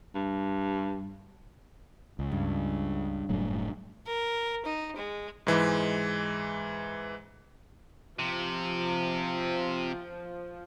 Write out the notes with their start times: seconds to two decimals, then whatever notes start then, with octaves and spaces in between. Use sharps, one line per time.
0.15 G2
2.19 C#2
2.32 G2
3.29 F#1 A2 F#3
4.06 A#4
4.65 D#4
4.96 G#3
5.47 G#2 E3 G#3
8.19 C3 F3